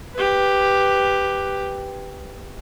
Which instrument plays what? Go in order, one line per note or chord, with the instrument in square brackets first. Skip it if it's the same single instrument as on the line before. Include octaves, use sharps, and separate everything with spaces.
[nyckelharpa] G4 B4